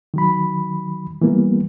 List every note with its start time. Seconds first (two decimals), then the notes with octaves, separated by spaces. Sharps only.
0.14 D#3 F#3 B5
1.22 E3 G3 A#3 B3